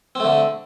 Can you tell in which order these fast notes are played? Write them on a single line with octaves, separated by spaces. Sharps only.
C4 A3 D3